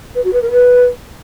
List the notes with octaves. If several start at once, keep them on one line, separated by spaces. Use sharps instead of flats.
B4
F#4
B4
A#4
B4